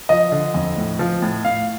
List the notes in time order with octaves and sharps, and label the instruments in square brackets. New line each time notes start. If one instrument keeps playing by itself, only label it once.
[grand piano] F3 D#5
D3
F2
A2
F3
A2
A2 F5